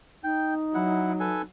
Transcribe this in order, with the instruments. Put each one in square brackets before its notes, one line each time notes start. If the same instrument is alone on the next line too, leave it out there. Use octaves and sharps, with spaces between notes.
[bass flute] D#4 [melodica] G5
[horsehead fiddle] F#3 [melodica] E4 F#5
[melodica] A4 B4 G#5